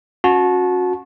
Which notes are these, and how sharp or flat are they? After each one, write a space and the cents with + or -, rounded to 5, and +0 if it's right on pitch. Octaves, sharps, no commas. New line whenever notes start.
C#4 -15 F#4 -25 A5 -25